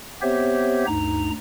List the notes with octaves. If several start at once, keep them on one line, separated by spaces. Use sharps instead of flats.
B3 C4 G4 C5 C#5 E5
D2 G2 D#4 A#5